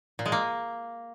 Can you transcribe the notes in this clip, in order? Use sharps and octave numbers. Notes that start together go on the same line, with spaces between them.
A#2
G#3
A#3